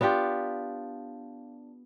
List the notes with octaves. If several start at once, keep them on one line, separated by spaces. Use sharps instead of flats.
B3 D4 F4 G4